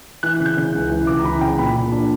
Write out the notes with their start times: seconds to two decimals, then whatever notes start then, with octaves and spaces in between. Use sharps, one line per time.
0.23 E3 F#6
0.40 C#3
0.46 G6
0.57 C#3
0.74 C#2
0.91 E3
1.07 C#2 D6
1.19 A#5
1.24 E3 B5
1.41 C#3 G5
1.58 A#2 B5
1.76 A#2
1.92 D4